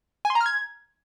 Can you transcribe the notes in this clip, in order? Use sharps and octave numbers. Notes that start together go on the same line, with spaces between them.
G#5
C6
A#5
F6
G#6